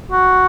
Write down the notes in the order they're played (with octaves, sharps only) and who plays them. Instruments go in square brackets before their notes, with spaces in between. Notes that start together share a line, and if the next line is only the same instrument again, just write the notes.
[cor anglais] F#4